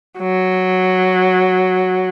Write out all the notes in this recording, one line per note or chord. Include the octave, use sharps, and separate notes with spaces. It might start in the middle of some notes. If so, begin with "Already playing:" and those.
F#3